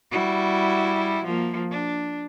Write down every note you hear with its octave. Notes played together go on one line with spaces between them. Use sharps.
G3 E4 F#4
F3 A#3
D4